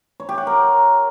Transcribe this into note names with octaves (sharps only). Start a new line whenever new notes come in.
C#5
G4
F#5
A#4